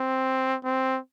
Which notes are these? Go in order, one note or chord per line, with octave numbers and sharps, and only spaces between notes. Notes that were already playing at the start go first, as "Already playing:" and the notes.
Already playing: C4
C4